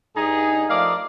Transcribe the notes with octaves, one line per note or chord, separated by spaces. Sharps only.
G2 D#4 G#4
F3 A3 A#4 D5 D#5 F5